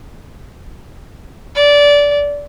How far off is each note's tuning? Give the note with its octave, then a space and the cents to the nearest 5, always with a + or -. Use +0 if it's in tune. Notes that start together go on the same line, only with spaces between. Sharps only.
D5 -20